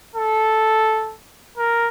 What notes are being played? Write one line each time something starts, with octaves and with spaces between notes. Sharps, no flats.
A4
A#4